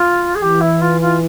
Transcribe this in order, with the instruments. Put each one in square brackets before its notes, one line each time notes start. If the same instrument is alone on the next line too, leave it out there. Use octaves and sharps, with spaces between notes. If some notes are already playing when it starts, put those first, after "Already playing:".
Already playing: [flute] F4
G#4
[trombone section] E3 [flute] G4
[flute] E4
F4
F4